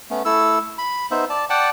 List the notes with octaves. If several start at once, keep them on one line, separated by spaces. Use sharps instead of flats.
A3 B3 C#4
A3 E4 A4 E6
B5
B3 D#4 C5 E5
D5 A5
D5 F#5 G5 A5